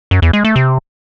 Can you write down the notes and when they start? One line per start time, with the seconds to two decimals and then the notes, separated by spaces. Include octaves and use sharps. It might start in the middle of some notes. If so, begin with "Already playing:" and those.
0.11 F#2
0.22 E2
0.33 G#3
0.45 A3
0.56 C3